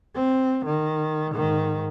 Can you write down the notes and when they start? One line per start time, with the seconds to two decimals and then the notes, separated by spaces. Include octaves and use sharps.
0.15 C4
0.66 D#3
1.34 G#2 D#3